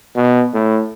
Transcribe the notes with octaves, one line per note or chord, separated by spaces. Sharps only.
B2
A2